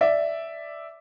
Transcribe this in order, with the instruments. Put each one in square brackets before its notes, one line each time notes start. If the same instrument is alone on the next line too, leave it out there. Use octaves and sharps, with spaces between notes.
[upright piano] D5 E5